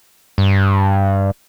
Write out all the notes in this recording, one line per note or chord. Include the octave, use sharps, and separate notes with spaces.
G2